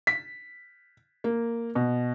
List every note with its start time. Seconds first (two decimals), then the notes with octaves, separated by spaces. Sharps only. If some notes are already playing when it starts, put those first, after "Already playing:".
0.07 B6
1.24 A#3
1.75 B2